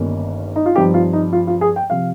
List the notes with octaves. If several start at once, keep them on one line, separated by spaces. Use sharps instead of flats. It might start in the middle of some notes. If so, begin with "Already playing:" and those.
Already playing: G1 G2 D#3 A#3 C#4
D#4
F4
G2 F3 C4 D#4 G4
F4
D#4
F4
F4
G#4
G5
C3 F3 F5